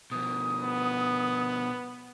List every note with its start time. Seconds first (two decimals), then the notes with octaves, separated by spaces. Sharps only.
0.11 B2 F3 D#6
0.63 B3